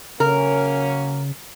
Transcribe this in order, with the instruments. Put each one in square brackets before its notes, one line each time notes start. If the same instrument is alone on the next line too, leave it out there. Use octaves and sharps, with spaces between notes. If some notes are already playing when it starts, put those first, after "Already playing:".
[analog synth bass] C#3 [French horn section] F#3 A#3 C#4 [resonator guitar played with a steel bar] A#4